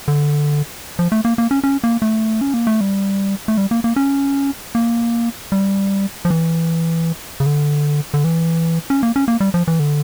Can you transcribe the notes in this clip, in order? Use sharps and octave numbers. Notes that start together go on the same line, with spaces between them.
D3
F3
A3
A#3
A#3
C#4
C#4
A#3
A3
C#4
A#3
A3
G3
A3
G3
A#3
A#3
C#4
A#3
G3
F3
E3
C#3
D3
D3
E3
C#4
A#3
C#4
A#3
G3
F3
E3
D3